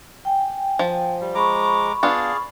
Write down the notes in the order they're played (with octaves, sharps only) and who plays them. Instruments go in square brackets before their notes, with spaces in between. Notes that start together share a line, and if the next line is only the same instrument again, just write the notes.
[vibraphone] G5 G#5
[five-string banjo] F3
[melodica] G3
[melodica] G#3 A#5 D6 [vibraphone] B5 C#6
[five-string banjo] B3 D4 F4 [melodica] G#4 D5 F5